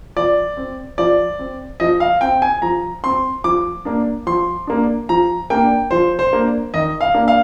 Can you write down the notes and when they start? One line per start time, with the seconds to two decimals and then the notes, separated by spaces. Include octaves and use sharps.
0.17 F3 D5
0.57 C4
0.98 F3 D5
1.39 C4
1.80 F3 D#5
2.00 F5
2.21 C4 G5
2.42 G#5
2.62 F3 A#5
3.04 C4 C6
3.44 F3 D6
3.85 A#3 D4
4.27 F3 C6
4.67 A#3 D4
5.09 F3 A#5
5.50 A#3 D4 G5
5.91 F3 C5
6.19 C5
6.33 A#3 D4
6.74 D#3 D#5
7.01 F5
7.14 A#3 D4
7.28 F5